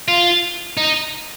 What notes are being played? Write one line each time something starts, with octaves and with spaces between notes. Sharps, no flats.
F4
D#4